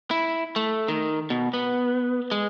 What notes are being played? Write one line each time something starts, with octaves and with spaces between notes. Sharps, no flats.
E4
A3
D#3
B2
B3
G#3